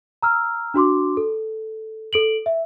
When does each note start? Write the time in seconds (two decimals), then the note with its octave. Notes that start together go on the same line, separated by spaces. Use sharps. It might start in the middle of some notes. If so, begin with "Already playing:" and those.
0.22 A#5 E6 F6
0.74 D4 F#4 C6 D6
1.17 A4
2.13 A4 D7 F#7
2.46 E5